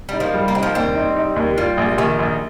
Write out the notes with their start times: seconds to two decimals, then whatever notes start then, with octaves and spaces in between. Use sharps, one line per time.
0.09 G3 D#4
0.20 F3 A#3
0.34 G3
0.48 A#3
0.55 C4 D#4
0.63 F3 A#3
0.75 D#2 G3 C4
0.95 D#4
1.16 D#4
1.36 D#2
1.57 G3 F4
1.78 A#1
1.98 A#1 D#3
2.19 A#1